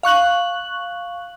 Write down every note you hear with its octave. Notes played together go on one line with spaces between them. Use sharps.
F5 C#6 F#6 F#7